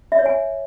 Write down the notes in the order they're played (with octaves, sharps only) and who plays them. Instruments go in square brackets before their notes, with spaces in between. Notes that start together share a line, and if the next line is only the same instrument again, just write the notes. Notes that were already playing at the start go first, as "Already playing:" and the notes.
[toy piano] E5
C#5
G#5